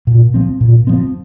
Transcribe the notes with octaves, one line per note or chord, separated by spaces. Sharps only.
A#2
F3 C4
A#2
F3 C4